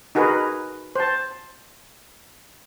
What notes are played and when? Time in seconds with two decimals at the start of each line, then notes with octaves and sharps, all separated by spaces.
0.15 D#4 F#4 G#4 A#4 B4
0.95 C5 A5